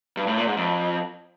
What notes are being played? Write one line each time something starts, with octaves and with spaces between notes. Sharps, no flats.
G2
A2
A#2
G#2
F2